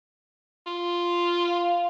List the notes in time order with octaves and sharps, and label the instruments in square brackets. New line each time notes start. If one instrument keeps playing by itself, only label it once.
[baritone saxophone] F4
[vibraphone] F5